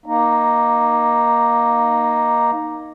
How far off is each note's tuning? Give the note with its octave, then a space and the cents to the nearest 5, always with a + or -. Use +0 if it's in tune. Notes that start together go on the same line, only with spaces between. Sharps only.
A#3 +15 D#4 +0